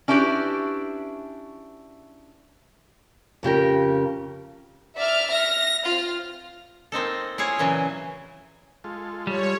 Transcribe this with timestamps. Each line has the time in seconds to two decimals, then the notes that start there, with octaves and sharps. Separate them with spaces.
0.08 C#4 D4 E4 F#4 G4 B4
3.43 F2 C#3 G4 A#4
4.97 D5 E5 F6
5.31 A#6
5.85 C4 F4 F6
6.92 A#3 C4 D#4 A4
7.38 E4 F4 G#4 C#5
7.59 A#2 C#3 E3 F#3
8.84 G#3 F4 A4
9.27 G3 C#5